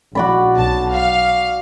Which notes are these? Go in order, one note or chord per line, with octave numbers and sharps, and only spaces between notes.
A#1 F#4 D5 B5
B1 A5
F5